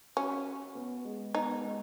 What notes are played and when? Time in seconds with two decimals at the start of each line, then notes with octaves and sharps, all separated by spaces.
0.17 C#4 F#4
0.46 F#4
0.75 B3
1.05 G#3
1.35 B3 D#4
1.64 G#3